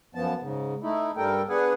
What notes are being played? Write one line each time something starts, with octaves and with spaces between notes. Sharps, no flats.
F#2 F3 B3 A5
G#2 C#3
A3 D#4 E4
G2 G3 A4 A#4 G5
B3 D4 G#4 B4 F#5 G#5